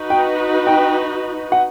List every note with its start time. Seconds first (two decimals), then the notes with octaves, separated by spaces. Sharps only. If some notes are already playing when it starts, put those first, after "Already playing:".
Already playing: D#4 F#4 B4
0.10 G5
0.67 G5
1.52 F#5